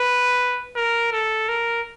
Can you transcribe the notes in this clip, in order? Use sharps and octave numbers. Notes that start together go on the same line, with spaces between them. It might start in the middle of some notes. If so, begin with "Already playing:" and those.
Already playing: B4
A#4
A4
A#4